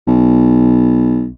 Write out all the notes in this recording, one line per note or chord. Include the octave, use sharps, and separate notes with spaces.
B1